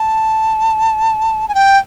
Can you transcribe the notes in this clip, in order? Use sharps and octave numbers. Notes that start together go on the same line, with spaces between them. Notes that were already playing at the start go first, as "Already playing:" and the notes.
Already playing: A5
G#5
G5